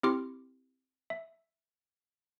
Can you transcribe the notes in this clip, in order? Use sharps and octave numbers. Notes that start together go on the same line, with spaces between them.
C4 E4 G4 C6 D6 F6
E5